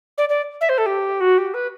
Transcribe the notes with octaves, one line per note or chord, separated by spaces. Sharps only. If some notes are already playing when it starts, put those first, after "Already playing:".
D5
D5
E5
C5
A4
G4
F#4
G4
B4